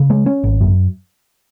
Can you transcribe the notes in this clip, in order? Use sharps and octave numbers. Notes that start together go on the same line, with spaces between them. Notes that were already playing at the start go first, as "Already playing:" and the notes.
Already playing: C#3
G#3
C#4
G#1
F#2